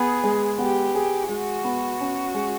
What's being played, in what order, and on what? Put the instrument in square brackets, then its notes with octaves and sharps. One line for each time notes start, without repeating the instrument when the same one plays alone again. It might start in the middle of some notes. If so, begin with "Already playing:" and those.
Already playing: [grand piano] B3 [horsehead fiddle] G#4
[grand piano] G#3
[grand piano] B3 [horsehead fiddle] G4
[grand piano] G#4
[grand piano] G#3 [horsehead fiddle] F#4
[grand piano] B3
C#4
G#3